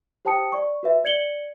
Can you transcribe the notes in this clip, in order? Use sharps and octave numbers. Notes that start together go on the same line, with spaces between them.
G4 C5 G5 A5 D#6 C#7
D5 C#6
F#4 B4 E5
D5 G#6 C#7 F#7 G7